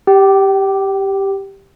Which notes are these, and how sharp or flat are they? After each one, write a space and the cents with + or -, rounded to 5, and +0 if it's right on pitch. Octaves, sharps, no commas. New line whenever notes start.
G4 +0 G5 -30